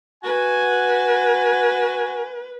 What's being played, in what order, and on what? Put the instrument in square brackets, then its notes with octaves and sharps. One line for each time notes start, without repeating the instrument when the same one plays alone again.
[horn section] F#4 G#5 [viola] B4